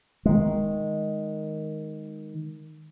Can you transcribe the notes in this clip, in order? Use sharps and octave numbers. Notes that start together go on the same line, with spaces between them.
D#3 G#3